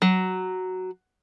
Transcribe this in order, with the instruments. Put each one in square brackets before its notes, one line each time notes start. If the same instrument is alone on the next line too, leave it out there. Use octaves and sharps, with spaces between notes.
[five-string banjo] F#3